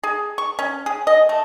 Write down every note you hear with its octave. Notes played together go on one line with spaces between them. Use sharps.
G#4
C#6
C#4
G#4
D#5
A3